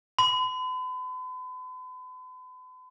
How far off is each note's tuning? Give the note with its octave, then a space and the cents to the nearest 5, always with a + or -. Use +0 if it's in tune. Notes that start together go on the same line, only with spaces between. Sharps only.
B5 +45